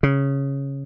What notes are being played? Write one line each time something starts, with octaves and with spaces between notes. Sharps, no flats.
C#3